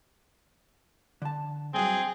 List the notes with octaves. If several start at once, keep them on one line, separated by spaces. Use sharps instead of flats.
D3 A5
G2 F#3 C4 G#4